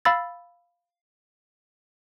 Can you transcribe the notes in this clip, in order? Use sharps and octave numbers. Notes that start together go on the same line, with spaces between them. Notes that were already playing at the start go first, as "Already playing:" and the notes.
F5 B5 E6 A6